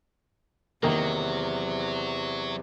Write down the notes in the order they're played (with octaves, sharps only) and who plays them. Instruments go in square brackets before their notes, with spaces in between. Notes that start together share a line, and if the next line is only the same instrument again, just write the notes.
[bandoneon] E2 C3 [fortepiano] D#3 A#3 [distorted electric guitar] F#3